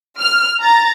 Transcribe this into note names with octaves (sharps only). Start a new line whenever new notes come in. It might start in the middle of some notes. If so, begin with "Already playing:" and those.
F6
A#5 A6